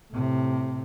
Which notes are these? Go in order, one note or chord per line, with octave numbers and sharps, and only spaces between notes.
A2 C3